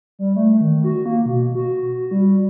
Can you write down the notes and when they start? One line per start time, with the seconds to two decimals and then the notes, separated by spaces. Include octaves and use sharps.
0.19 G3
0.36 A3
0.61 D#3
0.84 F#4
1.06 A#3
1.26 B2
1.55 F#4
2.11 G3